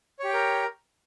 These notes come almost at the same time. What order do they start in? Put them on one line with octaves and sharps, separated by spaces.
C#5 G4 G5 A#4